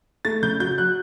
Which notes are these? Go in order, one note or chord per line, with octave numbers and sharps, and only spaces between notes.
A3 A6
C#3 G6
F#3 G6
F#3 F#6